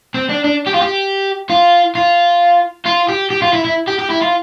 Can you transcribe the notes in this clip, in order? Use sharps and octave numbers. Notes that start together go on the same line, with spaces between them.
C4
D4
D4
G4
F4
G4
F4
F4
F4
G4
G4
F4
E4
E4
G4
G4
E4
F4